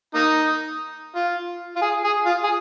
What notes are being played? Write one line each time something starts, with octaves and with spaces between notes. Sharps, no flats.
A#3 D#4
F4
F4
G#4
G#4
F4
G#4